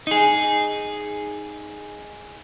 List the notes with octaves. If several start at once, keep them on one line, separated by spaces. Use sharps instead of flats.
D#4 G#4